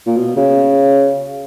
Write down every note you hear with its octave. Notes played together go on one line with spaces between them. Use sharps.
A#2
B2
C#3